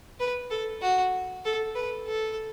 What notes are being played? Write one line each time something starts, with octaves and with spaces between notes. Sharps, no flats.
B4
A4
F#4
A4
B4
A4